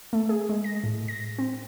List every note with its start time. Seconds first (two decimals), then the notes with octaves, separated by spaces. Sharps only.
0.13 A3
0.29 G#4
0.49 G#3
0.64 A#6
0.84 A2
1.08 A#6
1.38 C4